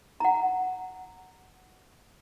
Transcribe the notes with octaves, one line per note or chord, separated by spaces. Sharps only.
F#5 A#5